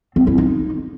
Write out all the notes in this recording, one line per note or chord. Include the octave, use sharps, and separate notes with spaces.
C4
E4
D#4